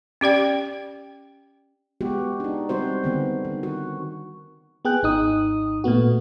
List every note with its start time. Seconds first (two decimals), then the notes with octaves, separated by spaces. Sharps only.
0.21 C#4 G4 D5 G5
2.01 G#3 B3 F#4 G4
2.40 D4 D#4
2.69 G3 C4 F#4 C5
3.04 D3 D#3 B3
3.45 D#3
3.63 F#4
4.85 B3 G#4 G5 F#6
5.03 G#1 D#4 D#6
5.84 A#2 A3 B3 F#4